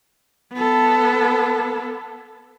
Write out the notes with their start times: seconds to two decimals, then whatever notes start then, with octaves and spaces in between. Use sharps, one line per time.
0.53 B3 A4